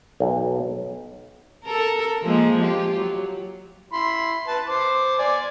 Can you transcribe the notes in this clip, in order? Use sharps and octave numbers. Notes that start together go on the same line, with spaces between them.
B1
A4 A#4
F3 G#3 A#3
F4 G4
F#3
E4 B5 C6
B4 A5
C5 D6
D5 G#5